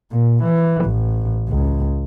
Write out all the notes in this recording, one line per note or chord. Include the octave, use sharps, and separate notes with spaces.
A#2
E3
A1
C#2